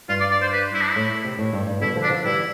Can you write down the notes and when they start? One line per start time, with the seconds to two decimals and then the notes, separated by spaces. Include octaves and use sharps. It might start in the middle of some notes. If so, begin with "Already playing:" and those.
0.09 G2 F4
0.20 D5
0.31 D5
0.42 C5
0.52 B4
0.74 E4
0.81 D4
0.89 E4
0.96 A2
1.24 C3
1.39 A2
1.53 G2
1.67 G2
1.81 B2 D3 E4
1.95 D3 F3
2.03 D4
2.10 D3 F3
2.24 E3 G3 E4